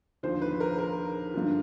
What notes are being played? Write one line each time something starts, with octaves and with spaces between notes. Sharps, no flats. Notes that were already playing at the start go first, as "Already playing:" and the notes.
D#2 D3 F3 C5
B4
A#4
A#4
G2 D3 F3